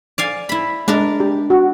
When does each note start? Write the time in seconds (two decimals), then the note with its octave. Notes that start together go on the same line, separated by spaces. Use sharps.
0.18 D5 F5 G#5
0.49 E4 B5
0.88 G#3 D4 A#4
1.20 G4
1.50 F#4